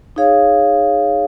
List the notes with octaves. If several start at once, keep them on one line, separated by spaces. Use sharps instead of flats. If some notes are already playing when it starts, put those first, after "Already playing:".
D#4 G#4 C#5 F5